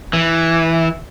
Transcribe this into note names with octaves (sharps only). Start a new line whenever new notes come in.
E3